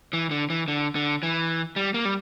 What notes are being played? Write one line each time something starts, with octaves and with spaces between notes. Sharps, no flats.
E3
D3
E3
D3
D3
E3
G3
A#3
G3